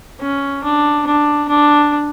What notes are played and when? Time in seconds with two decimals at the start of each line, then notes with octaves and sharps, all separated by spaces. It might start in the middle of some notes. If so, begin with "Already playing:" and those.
0.21 C#4
0.64 D4
1.07 D4
1.49 D4